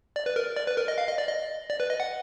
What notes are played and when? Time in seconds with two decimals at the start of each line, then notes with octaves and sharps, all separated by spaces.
0.16 D5
0.26 B4
0.36 A#4
0.56 D5
0.67 B4
0.77 A#4
0.88 D#5
0.98 F5
1.08 D#5
1.18 D5
1.28 D#5
1.70 D5
1.80 B4
1.90 D#5
2.00 F#5